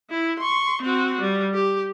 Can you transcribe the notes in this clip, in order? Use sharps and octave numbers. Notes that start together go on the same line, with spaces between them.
E4
C6 C#6
C4 F#4
G3
G4